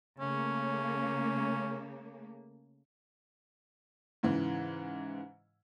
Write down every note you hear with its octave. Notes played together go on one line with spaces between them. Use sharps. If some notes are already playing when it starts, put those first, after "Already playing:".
C#3 A3 A#3 C#4
G#2 C#3 E3